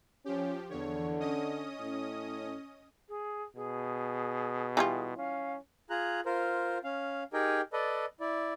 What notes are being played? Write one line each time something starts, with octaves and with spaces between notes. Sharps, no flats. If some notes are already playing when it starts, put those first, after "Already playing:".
F3 C#4 G4
E2 D3 C#5
C#4 D#5 D#6
A2
G#4
B2 G#4
E3 G3 F4
C#4 F5
F4 G#4 A#5 F#6
F4 A#4 C5
C#4 F5
D#4 G4 G#4 A#4 G5
A4 B4 D5 D#5
E4 D5